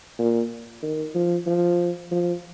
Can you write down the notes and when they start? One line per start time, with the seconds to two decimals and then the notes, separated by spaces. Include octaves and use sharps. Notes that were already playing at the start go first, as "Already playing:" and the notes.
0.19 A#2
0.83 D#3
1.15 F3
1.47 F3
2.11 F3